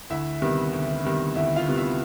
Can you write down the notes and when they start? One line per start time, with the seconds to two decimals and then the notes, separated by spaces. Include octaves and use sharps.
0.10 D2 E4 E5
0.41 C3 D#3 G3 B3
0.73 D2
1.04 C3 D#3 G3 B3
1.35 D2 E4 E5
1.56 F4 F5
1.67 C3 D#3 G3 B3
1.77 E4 E5